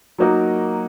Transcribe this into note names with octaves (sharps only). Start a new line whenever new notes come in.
F#3 A#3 D#4 F#4 A#4